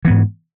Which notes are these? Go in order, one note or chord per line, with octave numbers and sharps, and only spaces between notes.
G#2 E3 B3